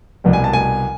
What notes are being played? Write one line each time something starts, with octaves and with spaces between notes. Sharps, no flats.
C2 B2 G3
G#5
A5
G#5